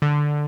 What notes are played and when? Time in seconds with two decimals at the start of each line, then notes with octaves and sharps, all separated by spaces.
0.02 D3